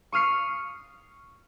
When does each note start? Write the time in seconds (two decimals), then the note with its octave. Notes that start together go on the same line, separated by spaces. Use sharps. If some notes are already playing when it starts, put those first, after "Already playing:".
0.12 C#6 D#6 F6 C7 C#7